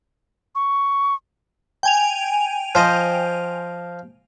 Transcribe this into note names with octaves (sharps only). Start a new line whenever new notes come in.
C#6
G5 G#5 F7
F3 C5 D#5